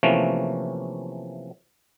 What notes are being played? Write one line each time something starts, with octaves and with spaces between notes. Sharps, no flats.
C3 E3 F3 A3 A#3 C#4